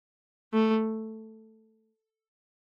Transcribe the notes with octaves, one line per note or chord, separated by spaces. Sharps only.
A3